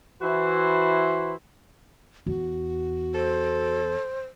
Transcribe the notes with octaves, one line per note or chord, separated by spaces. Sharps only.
E3 E4 F#4 C5
E2 F#4
A4 C5